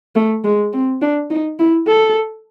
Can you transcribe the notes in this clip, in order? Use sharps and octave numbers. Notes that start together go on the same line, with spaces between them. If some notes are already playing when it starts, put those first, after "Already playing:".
A3
G#3
C4
D4
D#4
E4
A4